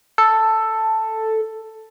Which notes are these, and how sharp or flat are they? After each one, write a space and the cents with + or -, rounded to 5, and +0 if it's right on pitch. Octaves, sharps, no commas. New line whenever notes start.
A4 +5